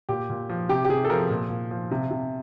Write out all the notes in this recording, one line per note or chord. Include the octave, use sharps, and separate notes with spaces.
A#2 G4
A#2
F3
C3 G4
G4
C3 G#4
A4
F3 A#4
A#2
A#2
F3
C3
C3